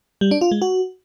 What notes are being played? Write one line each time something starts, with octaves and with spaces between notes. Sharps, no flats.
G3
D4
F4
G#3
F#4